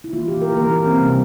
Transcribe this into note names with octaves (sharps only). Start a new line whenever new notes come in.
E4
E3 A#3 F4
G4
A#4
E3 A#3 A#4
C#4
C4
C3 G3 A#3